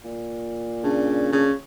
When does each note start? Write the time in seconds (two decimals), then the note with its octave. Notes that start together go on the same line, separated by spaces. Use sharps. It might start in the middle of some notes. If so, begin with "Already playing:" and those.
0.04 A#2
0.84 C#3 D4
1.33 C#3